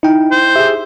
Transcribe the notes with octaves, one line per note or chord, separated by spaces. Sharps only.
D#4 E4 G5
C5
G4 G#4 E5